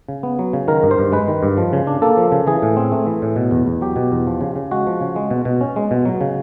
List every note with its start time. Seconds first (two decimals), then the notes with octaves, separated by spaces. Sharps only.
0.09 C#3
0.23 B3
0.39 F#3
0.53 C#3
0.68 D#3 A#4
0.83 G2
0.91 C5
0.99 G2
1.12 G#3 B4
1.28 D#3
1.43 G2
1.58 F3
1.73 C#3
1.87 D4
2.02 A#3 A4
2.17 F3
2.32 C#3
2.47 E3 G#4
2.62 A2
2.77 C4
2.92 A3
3.07 E3
3.22 A2
3.36 B2
3.51 E2
3.67 E2
3.81 F#3 G4
3.96 B2
4.12 E2
4.27 F3
4.41 C#3
4.56 C#3
4.71 G#3 F#4
4.87 F3
5.01 C#3
5.16 G#3
5.31 B2
5.45 B2
5.61 C#4
5.76 G#3
5.91 B2
6.05 F#3
6.21 C#3